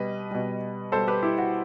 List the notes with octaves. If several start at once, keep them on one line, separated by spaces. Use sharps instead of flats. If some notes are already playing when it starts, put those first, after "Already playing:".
Already playing: B2 G3 B4 D#5
B2 G3
B2 G3 A4 C5
G4 B4
E4 G4
F#4